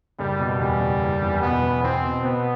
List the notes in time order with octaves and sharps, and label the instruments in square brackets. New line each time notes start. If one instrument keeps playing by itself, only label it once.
[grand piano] F#1 [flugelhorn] G3
[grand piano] B2
[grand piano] E2 [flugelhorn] G3
[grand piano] F#1
F#1
E2
[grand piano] B2 [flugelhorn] B3
[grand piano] E2
[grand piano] E2 [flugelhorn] C4
[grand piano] B2
[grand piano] B2 [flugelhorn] B3